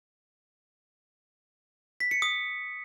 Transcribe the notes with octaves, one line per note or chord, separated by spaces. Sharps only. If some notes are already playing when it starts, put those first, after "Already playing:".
B6
C#7
D#6